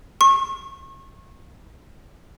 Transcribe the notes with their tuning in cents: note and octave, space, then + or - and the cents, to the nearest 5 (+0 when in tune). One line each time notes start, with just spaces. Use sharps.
C#6 -35